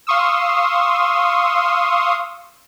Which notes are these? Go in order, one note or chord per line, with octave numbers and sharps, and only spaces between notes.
F5 C6 C#6 D#6 E6